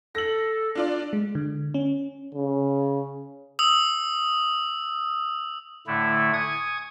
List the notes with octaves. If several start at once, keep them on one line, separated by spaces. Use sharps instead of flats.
A4 A#6 F#7
D4 F4 D5
G#3
D3
C#4
C#3
D#6 E6
A2 D3 A3 E4
G#5 C#6 D#6 G#6